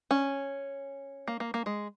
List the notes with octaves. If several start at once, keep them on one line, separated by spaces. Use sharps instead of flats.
C#4
A#3
A#3
A#3
G#3